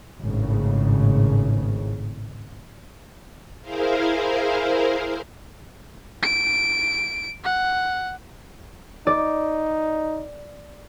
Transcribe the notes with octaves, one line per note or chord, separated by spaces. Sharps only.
G#1 A2 C#3
E4 G#4 A#4 C5 F5
D7
F#5
D#4 D5